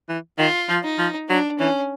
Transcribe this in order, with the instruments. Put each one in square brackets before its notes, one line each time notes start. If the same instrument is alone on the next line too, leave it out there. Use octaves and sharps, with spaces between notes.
[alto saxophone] E3
[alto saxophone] D#3 [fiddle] F4
[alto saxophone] F3
[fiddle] D#4
[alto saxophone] F3
[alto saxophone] F#3 [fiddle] D4
[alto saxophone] E3 [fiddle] C#4